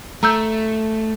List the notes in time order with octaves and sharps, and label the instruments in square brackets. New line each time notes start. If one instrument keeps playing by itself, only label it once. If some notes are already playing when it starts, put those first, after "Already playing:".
[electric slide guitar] A3 [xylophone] A#5 E6 G6